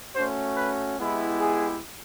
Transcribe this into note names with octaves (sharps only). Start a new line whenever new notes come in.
A3 C#4 F#4 C5
B4
G#3 B3 E4 G4
G#4